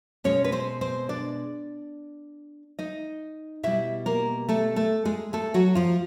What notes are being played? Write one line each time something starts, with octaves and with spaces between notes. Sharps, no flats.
B2 G#3 C#4 C#5
B4
C4 C5
C4 C5
D4 D5
D#4 D#5
B2 G3 E4 E5
A#3 A#4
A3 A4
A3 A4
G#3 G#4
A3 A4
F#3 F#4
F3 F4